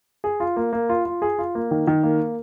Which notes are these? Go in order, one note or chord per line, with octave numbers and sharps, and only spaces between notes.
G#4
F4
A#3
A#3
F4
F4
G#4
F4
A#3
D#3
D#3
A#3